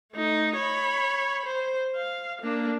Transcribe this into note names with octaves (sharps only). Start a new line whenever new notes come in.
A3 D#4
C#5 B5
C5
F5
A#3 D4